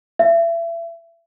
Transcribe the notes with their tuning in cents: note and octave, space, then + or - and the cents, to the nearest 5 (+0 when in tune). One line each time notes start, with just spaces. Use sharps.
E5 +30